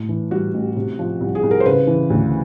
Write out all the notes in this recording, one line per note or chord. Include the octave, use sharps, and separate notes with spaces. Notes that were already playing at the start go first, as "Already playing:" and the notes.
Already playing: A2
E3
G3 F#4
A1
C3
F3
C2
G#4
C2
A#4
C5
C#3 B4
E3
D2